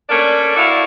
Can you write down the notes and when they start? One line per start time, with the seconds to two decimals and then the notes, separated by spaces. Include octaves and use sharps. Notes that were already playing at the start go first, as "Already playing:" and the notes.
0.09 A3 A#3 C#4 D4 D5
0.56 A2 E4 F#4 D5 F5